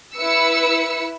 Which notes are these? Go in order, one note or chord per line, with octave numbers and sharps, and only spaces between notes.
E4 B4 E6 C#7